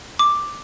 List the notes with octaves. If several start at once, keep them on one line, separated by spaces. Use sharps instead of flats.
D6